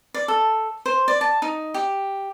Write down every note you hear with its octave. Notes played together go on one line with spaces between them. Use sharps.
D5
A4
C5
D5
A5
D#4
G4